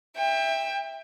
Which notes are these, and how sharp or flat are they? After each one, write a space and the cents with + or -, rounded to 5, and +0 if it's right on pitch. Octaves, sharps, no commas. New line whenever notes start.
E5 +0 G5 +30